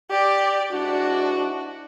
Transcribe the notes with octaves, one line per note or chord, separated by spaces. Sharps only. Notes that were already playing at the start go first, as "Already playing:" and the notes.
G4 D5
G#2 D4 E4 F#4